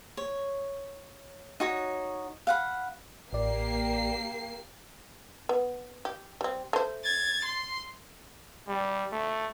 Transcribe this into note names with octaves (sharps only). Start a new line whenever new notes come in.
C#5
D#4 F#4 C#5
F5 F#5 B5
A1 A#3 G4 D5 C7
B3
G4
G3 C4
A3 C5
G#6 A6
C6
G3
A3